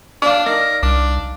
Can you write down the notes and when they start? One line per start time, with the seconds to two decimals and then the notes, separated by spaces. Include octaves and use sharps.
0.22 D4 D5 F5
0.46 D#4 A#4
0.83 C2 D4